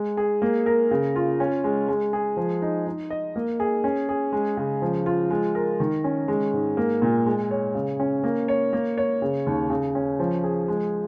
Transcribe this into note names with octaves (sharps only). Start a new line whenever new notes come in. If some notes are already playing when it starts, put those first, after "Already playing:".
Already playing: G#3
G#4
A#3
A#4
C#3
F4
C#4
G#3
G#3
G#4
F3
D#4
D#4
D#5
A#3
G#4
C#4
G#4
G#3
C#3
F3
F4
G#3
A#4
D#3
C#4
G#3
G#2
A#3
A#2
G#3
C#5
C#3
C#4
A#3
C#5
A#3
C#5
C#3
D#2
C#3
C#4
F3
G#4
G#3